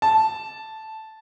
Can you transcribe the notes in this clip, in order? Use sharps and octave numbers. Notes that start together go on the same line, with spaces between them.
A5